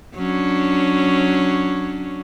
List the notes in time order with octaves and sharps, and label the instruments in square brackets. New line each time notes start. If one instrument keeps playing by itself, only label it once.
[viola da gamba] F#3 C#4 D4